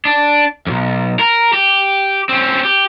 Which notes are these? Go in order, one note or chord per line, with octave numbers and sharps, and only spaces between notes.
D4
B1 F2
A#4
G4
C4 C#4
G4